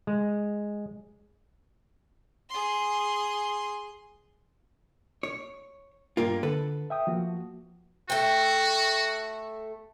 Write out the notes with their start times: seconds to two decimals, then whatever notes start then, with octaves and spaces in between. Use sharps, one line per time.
0.07 G#3
2.50 G#4 C6
5.23 C#5
6.17 G2 A#3 F4
6.43 D3 A4 B4
6.90 E5 G5 D#6
7.07 F3 A#3 F#4
8.10 A3 F#4 G5